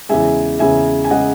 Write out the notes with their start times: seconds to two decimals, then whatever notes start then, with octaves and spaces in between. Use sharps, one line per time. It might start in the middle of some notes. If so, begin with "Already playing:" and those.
0.09 E2 C#3 G#3 E5 G#5
0.59 E2 C#3 G#3 E5 G#5
1.05 G#5
1.10 C#3 G#3 D#5 F#5